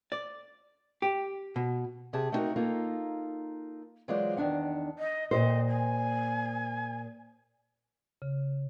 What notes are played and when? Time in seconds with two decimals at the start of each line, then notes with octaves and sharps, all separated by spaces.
0.12 D5
1.02 G4
1.56 B2
2.13 C3 G4 G#4 A5
2.32 A3 B3 C4 D#4 F#4 A#4
2.56 A#3 D#4 F4 A4 A#4
4.08 E3 F#3 G#3 F4 C5 D5
4.37 E2 D#3 E3 D4 F#5
4.99 D#5
5.31 A#2 G4 C5 D#5
5.68 G#5
8.22 C#3